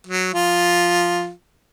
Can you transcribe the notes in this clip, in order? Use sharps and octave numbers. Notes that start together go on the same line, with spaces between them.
F#3
F3 F4